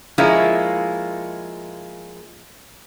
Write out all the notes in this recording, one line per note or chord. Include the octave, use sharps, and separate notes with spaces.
F3 G#3 A#3 C#4 E4